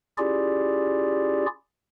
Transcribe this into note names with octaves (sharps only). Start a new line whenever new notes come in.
C#4 E4 F4 G4 G#4 D5